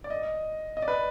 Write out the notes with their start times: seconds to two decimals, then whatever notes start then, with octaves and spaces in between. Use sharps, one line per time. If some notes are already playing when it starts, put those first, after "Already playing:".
0.04 D5
0.10 D#5
0.77 D#5
0.82 D5
0.88 B4